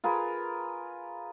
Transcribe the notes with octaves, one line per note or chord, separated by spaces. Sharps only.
F4 G#4 A#4 B4